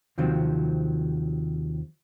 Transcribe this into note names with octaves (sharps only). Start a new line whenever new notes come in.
D#2 C3 D#3 F3 F#3 C4